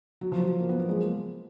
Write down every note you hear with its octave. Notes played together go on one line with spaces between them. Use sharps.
F#3
F3
F#3
A#3
B3
A#3
G#3